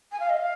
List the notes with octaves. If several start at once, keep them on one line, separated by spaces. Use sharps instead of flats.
G#5
F5
D#5
F5